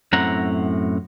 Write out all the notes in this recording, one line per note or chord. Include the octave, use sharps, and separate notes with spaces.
F#2 A2 C4 F#5 A#5